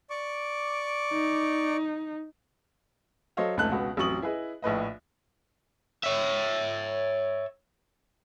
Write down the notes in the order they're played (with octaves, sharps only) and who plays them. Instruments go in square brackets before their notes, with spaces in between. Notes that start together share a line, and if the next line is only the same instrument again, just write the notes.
[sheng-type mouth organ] D5 C#6 D6
[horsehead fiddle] D#4
[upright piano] F#3 A4 C5 C#5 D#5 F5
F1 C#2 A3 D#4 A5 F#6
C#2 B2 F#4
A1 F2 F#3 C#6 D#6 F#7
E4 G#4 B4 D#5
A#1 A2 B4 D#5
[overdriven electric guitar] C#5 E5